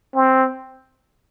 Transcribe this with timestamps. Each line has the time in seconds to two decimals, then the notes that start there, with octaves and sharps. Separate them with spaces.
0.15 C4